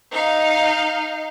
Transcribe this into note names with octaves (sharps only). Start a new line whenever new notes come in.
D#4 F5